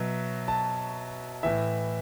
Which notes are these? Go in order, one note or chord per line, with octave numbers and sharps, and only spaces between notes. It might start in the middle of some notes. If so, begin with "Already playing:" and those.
Already playing: B2 F#3 E5
A5
A2 E3 E5